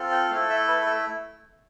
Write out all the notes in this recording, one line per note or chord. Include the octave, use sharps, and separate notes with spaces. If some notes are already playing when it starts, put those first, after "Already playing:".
Already playing: C4 F4 A4
G5
A3 E4 A4 F5
E5
B4
A4